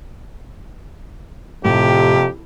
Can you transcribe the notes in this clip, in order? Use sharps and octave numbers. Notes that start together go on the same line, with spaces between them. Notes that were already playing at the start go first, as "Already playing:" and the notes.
F2 A2 C3 G4